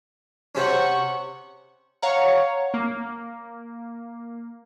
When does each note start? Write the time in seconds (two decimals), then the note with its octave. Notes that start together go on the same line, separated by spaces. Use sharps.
0.55 C3 C4 C#4 F#5 C#6
2.02 C#5 F5 F#5 A#5 C#6
2.74 A#3